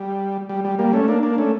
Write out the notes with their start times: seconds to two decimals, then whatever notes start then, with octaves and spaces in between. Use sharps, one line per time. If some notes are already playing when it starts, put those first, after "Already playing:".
Already playing: G3
0.49 G3
0.64 G3
0.79 G3 A#3
0.93 A3 C#4
1.08 A#3 D4
1.23 A#3 D4
1.38 A3 C#4